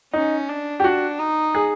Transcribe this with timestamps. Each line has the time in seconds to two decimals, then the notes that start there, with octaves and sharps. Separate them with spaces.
0.13 C#4 D#4
0.49 D4
0.80 G4
0.84 D4 F#4
1.19 D#4
1.55 G#4